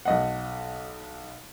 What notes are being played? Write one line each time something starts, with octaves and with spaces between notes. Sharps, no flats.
B1 D#5 F#5